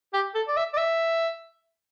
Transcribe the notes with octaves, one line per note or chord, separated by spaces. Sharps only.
G4
A4
D5
E5
D5
E5